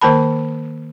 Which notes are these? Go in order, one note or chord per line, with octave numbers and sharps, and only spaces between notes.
D#3 A#3 A#4 A5 B5